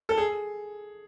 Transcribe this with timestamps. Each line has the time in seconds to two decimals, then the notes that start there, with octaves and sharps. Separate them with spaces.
0.09 A4
0.18 G#4